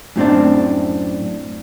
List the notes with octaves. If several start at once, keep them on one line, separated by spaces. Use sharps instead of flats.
F#2 A2 C4 D4